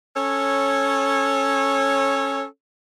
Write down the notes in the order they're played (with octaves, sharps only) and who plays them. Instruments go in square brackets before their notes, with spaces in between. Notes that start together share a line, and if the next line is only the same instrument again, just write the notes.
[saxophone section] C#4 A4 C#5